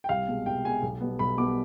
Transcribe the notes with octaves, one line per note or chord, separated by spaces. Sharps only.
G5
C2 F5
B2 G#3
C2 G5
B2 G#3 G#5
B1
B2 G3 B3
B1 B5
B2 G3 B3 D6